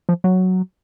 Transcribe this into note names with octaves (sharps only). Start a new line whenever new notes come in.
F3
F#3